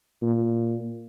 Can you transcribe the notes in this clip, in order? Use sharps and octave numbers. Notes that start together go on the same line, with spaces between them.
A#2